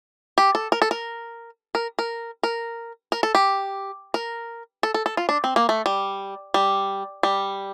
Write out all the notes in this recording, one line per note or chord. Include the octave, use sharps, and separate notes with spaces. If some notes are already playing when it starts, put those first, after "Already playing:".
G4
A4
A#4
A4
A#4
A#4
A#4
A#4
A#4
A4
G4
A#4
A4
A4
A4
F4
D4
C4
A#3
A3
G3
G3
G3